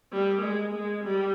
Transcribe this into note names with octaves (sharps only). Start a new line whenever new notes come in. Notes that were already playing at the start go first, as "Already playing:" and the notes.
G3
G#3
G#3
G3